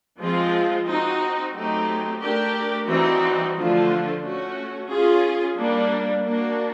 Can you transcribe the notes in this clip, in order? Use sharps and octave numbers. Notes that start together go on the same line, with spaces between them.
F3 G#3 C4 F4
C4 D#4 F#4
F#3 A3 C4 D#4 G4
A3 D4 G4 A#4
E3 G3 C4 D#4 F#4
D3 F3 A3 D4 F4
A3 C#4 F#4
C#4 F4 G#4
G3 A#3 D4
A#3 D4 F#4